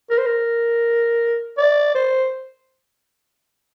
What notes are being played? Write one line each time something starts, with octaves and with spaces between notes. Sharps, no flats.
A#4
C5
A#4
D5
C5